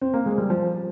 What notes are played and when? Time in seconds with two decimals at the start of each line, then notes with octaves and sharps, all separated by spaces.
0.01 C4
0.14 A#3
0.26 G#3
0.38 G3
0.50 F3